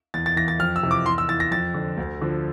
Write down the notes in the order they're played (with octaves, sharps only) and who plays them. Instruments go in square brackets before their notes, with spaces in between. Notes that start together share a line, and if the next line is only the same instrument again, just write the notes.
[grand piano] E2 A6
A6
E3 A#6
A6
F2 F6
E6
C3 E3
D6
E2 C6
E6
E3 A6
A#6
F2 A6
D3 F3
D2
D3 F3